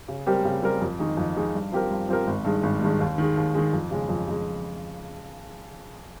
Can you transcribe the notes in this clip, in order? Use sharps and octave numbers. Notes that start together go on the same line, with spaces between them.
C#3
G3 C4 G4 A#4
C#3
G3 C4 G4 A#4
F2
D#3 G#3 D#4 G#4
F2
D#3 G#3 D#4 G#4
G2
F3 C4 G4 A#4
G2
F3 C4 G4 A#4
G#1
G2 D#3 G#3
G#1
G2 D#3 G#3
D#2
D#3 G#3
D#2
D#3 G#3
F2
C#3 G#3
F2
C#3 G#3